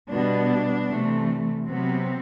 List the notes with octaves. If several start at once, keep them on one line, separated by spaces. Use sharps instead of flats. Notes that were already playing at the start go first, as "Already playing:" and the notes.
B2 G3 B3 D4
C3 E3 A3
C3 F#3 B3 C4